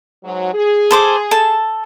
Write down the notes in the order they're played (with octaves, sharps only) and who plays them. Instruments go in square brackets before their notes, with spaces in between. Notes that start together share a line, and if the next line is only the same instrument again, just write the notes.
[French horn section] G#2 F#3
G#4
[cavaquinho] A4 C5 D6
A4 A5